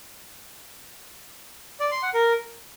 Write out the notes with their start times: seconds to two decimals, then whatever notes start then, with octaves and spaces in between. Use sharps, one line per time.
1.80 D5
1.91 C6
2.03 F#5
2.14 A#4